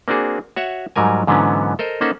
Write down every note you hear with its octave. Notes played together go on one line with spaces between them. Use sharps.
A#3 C4 D4 F#4 G#4
F#4 C#5 E5 F#5
G#2 F#3 G3 A#4 G#5
G#2 D3 E3 F#3 B3 C#4
A4 A#4 C5 D#5
A#3 C#4 D#4 A4 C5 F#5